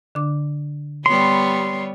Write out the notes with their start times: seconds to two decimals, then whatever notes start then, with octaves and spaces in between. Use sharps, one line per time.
0.15 D3 D4 D6
1.06 G3 B3 C#5 C6